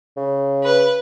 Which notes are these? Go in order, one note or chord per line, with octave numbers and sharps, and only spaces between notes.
C#3
B4